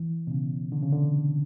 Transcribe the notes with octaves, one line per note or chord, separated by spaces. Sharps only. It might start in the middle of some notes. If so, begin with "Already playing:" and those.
Already playing: E3
B2
C#3
D3
C#3
D3